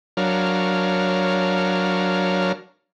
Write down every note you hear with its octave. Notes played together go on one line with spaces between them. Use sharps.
F#3 D4 A#4 C#5 F5